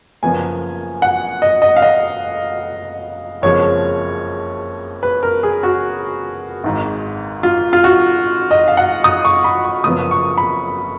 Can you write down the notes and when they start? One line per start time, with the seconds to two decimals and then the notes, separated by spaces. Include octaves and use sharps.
0.22 F#1 F#2 F3 B3 G#5
1.02 F#5
1.42 D#5
1.62 D#5
1.76 F5
1.82 D#5
3.42 F#1 F2 F3 G#3 C#5
5.03 B4
5.23 A#4
5.43 G#4
5.63 F#4
6.64 G#1 G#2 D#3
7.43 F4
7.73 F4
7.84 F#4
8.51 D#5
8.68 F5
8.77 F#5
9.04 D#6
9.25 C#6
9.44 B5
9.64 C#6
9.84 F#1 F#2 F3 B3 D#6
10.11 C#6
10.38 B5